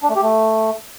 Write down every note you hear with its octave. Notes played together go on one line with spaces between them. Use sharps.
D4
A3
G4
A3